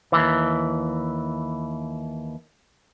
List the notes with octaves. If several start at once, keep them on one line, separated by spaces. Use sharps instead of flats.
D#2 E3